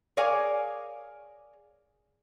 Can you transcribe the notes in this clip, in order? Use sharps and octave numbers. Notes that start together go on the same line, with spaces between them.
G#4 A#4 C#5 D5 F5 G#5